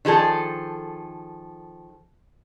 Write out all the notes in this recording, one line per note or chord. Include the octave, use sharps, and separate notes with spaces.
D#3 F3 G#4 A4